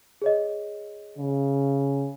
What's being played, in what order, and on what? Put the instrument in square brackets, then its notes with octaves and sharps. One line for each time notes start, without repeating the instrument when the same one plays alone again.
[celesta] G#4 C#5 D#5
[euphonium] C#3